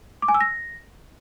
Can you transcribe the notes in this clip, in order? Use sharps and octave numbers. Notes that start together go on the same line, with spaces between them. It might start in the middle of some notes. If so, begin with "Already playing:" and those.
D6
G#5
E6
A#6